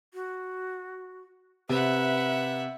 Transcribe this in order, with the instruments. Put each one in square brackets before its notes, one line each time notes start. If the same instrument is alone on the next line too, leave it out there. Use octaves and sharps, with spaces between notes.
[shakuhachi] F#4
[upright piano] C3 [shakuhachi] B4 [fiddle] E5 F#5